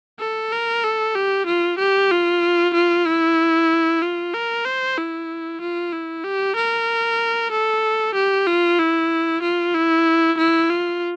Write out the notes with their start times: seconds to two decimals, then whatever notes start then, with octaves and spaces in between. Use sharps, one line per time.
0.19 A4
0.52 A#4
0.84 A4
1.15 G4
1.47 F4
1.79 G4
2.11 F4
2.74 F4
3.06 E4
4.02 F4
4.34 A#4
4.65 C5
4.97 E4
5.61 F4
5.93 E4
6.24 G4
6.56 A#4
7.52 A4
8.15 G4
8.47 F4
8.79 E4
9.42 F4
9.74 E4
10.38 E4
10.70 F4